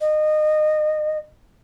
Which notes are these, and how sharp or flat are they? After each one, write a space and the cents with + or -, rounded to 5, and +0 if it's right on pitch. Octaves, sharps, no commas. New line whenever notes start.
D#5 -25